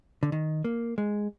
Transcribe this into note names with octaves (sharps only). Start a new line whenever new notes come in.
D3
D#3
A#3
G#3